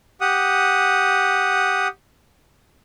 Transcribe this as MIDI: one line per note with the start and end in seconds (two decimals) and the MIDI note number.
0.21 1.88 67
0.21 1.88 78
0.21 1.88 87